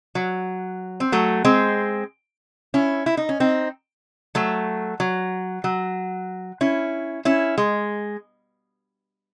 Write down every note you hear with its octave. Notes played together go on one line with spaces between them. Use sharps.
F#3
C4
F#3 A3
G#3 C4
C#4 E4
E4
D#4
C#4
C4 D#4
F#3 A3
F#3
F#3
C#4 E4
C#4 E4
G#3